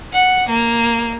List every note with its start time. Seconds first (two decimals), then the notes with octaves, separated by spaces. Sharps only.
0.13 F#5
0.49 A#3